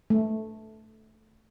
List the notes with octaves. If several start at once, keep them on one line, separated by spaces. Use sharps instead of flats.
A3